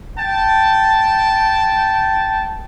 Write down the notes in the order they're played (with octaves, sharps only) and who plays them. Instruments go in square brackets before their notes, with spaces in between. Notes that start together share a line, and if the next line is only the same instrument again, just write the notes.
[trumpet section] G5 A5